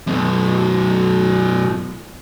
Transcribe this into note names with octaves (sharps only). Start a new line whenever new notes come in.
F#2 B2